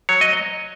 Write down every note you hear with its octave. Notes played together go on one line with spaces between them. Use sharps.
F#3 C#5
D#5